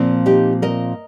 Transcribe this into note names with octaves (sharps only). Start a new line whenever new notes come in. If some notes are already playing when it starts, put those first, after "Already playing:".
Already playing: A#2 F3 C4
D#4 G4
A#4 D#5